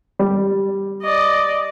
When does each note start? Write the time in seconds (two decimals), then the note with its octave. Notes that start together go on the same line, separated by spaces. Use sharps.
0.19 G3
1.03 D5 D#5